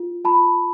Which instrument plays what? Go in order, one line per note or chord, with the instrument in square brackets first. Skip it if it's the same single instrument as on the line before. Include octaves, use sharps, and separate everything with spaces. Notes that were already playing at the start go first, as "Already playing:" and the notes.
Already playing: [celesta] F4
F4 A5 B5